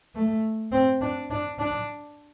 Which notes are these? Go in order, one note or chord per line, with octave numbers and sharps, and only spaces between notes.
A3
C4
D4
D4
D4